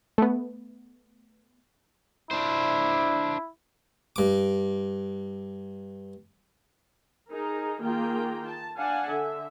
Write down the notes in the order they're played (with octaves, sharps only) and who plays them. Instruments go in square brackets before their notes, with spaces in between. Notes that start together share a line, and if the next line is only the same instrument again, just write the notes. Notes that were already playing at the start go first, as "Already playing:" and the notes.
[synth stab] A3 B3
[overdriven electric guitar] D4 C5 [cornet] E4
[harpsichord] G2 D6
[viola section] D#4 G#4 A#4
D#3 A#3 F4 G#4 G5 A#5
A5
D4 F5 F#5 G#5 A5
D3 E5